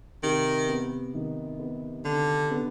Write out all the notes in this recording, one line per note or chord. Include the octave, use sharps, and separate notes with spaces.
C3 D#3
B3
D#3
B3
D3 D4
B3